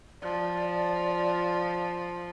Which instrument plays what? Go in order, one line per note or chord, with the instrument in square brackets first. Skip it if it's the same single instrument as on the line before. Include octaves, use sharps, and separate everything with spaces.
[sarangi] F3 [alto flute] D5